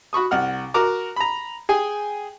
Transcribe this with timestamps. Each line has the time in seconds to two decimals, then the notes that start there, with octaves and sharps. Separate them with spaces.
0.13 F#4 B5 C#6 D#6
0.31 C2 F#5 F6
0.74 F#4 A#4 A#5 D6
1.16 A#5 B5
1.69 G#4 G5 G#5